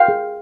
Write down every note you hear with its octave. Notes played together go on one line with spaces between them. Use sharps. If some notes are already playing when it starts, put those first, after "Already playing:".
Already playing: F5 G5
G#4